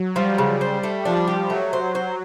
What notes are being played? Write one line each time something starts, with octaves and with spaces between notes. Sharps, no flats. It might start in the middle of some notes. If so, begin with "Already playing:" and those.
Already playing: F#3
F3 G3
C#3
C5
A3
F3 D4
G4
F#3 A3
C5
C5